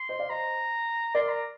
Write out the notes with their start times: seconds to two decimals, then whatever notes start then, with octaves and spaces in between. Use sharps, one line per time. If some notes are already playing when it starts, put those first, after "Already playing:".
Already playing: C6
0.09 C5 D#5
0.19 D5 F5
0.30 C5 D#5 A#5
1.15 A#4 D5 C6
1.29 A#5